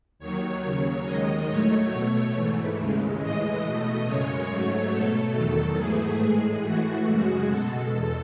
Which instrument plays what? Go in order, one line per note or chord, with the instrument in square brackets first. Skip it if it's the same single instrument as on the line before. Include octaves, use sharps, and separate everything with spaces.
[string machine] D#2 D#3 F#3 C#5
D#2 C#3 F#3
D#2 D#3 G#3 D#5
A2 F#3 A3 C#5
B2 A3
G#2 E3 A3
D#2 C#3 G#3
A2 E3 G#3 D#5
B2 A3
F#2 C#3 G#3 C#5
G#2 F#3 A3
B2 A3 A4
E2 D#3 F#3
G#2 E3 A3 G#4
A2 G#3
A2 E3 A3 F#4
F#2 C#3 G#3
B2 G#3 A4
E2